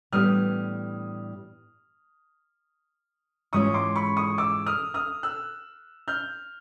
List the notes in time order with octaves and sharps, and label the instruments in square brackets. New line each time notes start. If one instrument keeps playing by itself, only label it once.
[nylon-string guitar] A2 E3 G3 B3 D4 [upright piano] D#6 F6
[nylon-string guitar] G#2 E3 G#3 C#4 F4 [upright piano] C#6 D#6
[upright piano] C6 D6
B5 C#6
C#6 D#6
D6 E6
D#6 F6
D#6 F6
E6 F#6
F6 G6